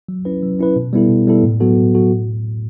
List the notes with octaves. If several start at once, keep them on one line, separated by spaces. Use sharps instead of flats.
F#3
C#4 E4 B4
F#3
C#4 E4 B4
B2
G3 B3 E4 A4
B2
G3 B3 E4 A4
A2
F#3 B3 F#4 A4
A2
F#3 B3 F#4 A4
A2